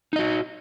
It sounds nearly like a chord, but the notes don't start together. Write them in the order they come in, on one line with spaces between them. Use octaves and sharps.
D#4 D#5 F#4